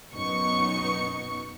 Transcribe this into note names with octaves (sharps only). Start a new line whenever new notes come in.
F#2 B2 B3 D#4 C#6 C#7